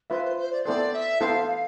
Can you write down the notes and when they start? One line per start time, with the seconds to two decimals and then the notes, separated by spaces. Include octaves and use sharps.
0.10 F4 B4 C5 E5
0.24 C5
0.37 C5
0.52 D5
0.65 B3 E4 A4 C5 D5
0.93 E5
1.21 B3 E4 A4 C5 F5
1.48 F5